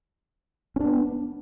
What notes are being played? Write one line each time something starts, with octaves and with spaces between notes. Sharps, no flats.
B3 C#4 D4